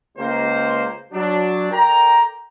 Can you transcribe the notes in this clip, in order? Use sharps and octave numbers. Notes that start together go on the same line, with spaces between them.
C#2 A#3 C5
F#3 D4
A4 A#4 D5 G5 A#5